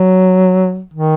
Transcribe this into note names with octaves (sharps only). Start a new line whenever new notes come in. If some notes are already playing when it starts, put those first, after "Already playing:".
Already playing: F#3
D#3